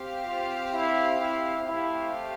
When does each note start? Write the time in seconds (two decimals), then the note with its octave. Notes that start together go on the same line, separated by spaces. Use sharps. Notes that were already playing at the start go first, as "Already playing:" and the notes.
Already playing: C4 G4 C5 F5
0.24 F4
0.72 E4
1.19 E4
1.68 A3 C4 E4 G4 C5 F5